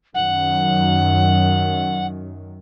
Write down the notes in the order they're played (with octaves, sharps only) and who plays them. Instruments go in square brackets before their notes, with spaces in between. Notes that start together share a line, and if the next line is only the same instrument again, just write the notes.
[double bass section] F#2 D#3 [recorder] F#5